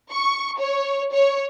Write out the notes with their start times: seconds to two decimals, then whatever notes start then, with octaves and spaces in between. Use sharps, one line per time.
0.12 C#6
0.60 C#5
1.13 C#5